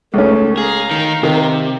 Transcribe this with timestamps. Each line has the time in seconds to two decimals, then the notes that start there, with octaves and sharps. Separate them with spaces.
0.14 C#2 A3 C#4
0.58 G#4 F5 A#5
0.91 D#3
1.23 C3 D#3